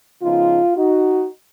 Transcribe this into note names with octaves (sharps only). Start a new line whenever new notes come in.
C#3 F3 B3 D#4 F4
D#4 F#4